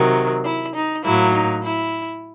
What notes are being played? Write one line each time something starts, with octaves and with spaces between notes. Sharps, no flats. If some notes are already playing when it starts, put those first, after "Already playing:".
Already playing: C3 D#3 F#3
E4
D#4
A2 F#3 A#3 E4
D#4
E4